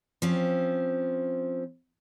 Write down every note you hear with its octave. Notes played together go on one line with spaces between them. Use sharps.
F3 C4 C#4